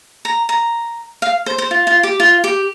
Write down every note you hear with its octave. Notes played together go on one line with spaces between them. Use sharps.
A#5
A#5
F5
C5
C5
F4
F4
G4
F4
G4